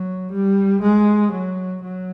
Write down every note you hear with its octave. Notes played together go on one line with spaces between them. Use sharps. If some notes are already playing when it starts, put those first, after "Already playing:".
Already playing: F#3
G3
G#3
F#3
F#3